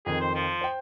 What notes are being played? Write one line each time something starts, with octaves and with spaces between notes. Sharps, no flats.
F2 D#3 G#4
C5
F3
C5 G5